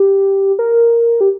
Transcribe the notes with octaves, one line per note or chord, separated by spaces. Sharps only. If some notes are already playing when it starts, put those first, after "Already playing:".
Already playing: G4
A#4
G4